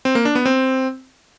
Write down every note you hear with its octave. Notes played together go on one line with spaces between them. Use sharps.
C4
A#3
D4
B3
C4